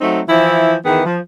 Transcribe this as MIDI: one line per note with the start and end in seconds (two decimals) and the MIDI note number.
0.01 0.21 54
0.01 0.21 57
0.01 0.21 60
0.01 0.21 63
0.28 0.74 52
0.28 0.74 53
0.28 0.74 64
0.85 1.01 51
0.85 1.01 52
0.85 1.01 59
0.85 1.01 68
1.05 1.18 53